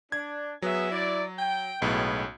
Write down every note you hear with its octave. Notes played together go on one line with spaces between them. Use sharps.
D4 G#6
F#3 B3 G#4 E5
E4 D5
G5
B1 A2 G#3 B3 C#4